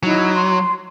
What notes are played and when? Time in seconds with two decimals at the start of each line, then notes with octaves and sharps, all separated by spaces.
0.03 F#3 D#4 E4
0.34 C6